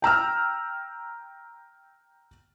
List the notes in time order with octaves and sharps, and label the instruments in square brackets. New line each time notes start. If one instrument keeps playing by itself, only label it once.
[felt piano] G5 A#5 E6 F6